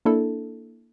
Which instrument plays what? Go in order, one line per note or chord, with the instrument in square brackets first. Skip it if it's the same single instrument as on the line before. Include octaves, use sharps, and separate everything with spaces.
[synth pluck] A#3 D4 E4 A4